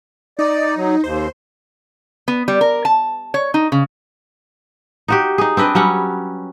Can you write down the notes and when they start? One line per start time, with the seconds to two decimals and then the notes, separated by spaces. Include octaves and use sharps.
0.39 D#4 D5
0.77 F#3
1.04 D#2 C5
2.28 B3
2.48 G3
2.61 A#4
2.85 A5
3.34 C#5
3.54 D#4
3.72 C#3
5.08 D#4 F#4 G4
5.38 D#4 G#4
5.57 C4 D4 B4 D#5
5.75 F#3 G3 C#4 F#5